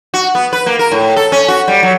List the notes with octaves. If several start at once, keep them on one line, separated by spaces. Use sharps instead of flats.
F#4
B3
B4
A#3
A#4
A2
A4
C#4
F#4
G3
F#3